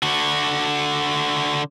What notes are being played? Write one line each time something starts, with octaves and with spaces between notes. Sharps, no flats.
D3 F#4